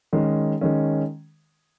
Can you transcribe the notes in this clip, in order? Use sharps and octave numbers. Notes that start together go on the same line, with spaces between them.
D#3 G#3 C#4
D#3 G#3 C#4